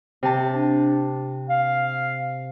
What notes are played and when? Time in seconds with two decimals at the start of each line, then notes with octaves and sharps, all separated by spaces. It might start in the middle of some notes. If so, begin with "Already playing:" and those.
0.23 C3 A5
0.52 D4
1.50 F5